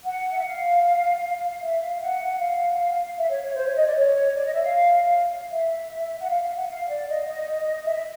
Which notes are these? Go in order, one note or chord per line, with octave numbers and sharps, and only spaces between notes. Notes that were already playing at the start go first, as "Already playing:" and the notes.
F#5
E5
F5
E5
F5
F#5
F5
E5
C#5
C#5
C5
C#5
D#5
D5
C#5
D5
D#5
E5
F5
E5
F#5
F5
F5
F#5
F5
D5
D#5
D#5
E5